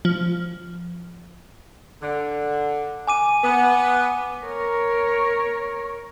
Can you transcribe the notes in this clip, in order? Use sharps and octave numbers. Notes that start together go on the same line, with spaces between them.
F3
D3
G#5 D6 D#7
B3
A#4 C#5